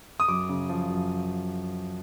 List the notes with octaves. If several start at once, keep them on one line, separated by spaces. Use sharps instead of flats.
D#6
F#2 D6
C#3
F3
F#2